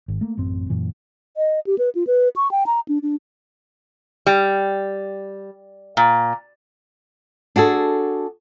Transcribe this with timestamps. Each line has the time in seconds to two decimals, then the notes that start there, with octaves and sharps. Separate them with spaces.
0.08 G#1
0.21 A3 A#3
0.37 A1 F#2 C4
0.70 F#2 A#2 E3
1.37 D#5
1.67 G4
1.78 B4
1.95 F4
2.07 B4
2.36 C#6
2.51 G5
2.67 A#5
2.88 D4
3.02 D4
4.26 G3
5.97 A#2
7.56 D4 F#4 G#4 A4